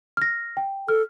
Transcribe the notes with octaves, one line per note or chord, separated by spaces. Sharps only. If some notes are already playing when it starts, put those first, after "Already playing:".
F6 A#6
G5
A4 F6